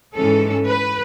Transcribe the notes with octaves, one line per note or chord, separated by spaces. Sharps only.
G#2 E3 G#3 C#4 A4
B4